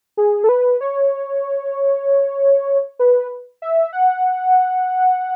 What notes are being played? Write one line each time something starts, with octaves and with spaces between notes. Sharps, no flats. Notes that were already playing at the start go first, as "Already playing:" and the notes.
G#4
A4
B4
C#5
B4
E5
F#5